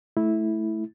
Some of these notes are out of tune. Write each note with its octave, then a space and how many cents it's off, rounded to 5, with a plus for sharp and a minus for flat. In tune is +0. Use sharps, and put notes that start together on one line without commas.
A3 -15 E4 -10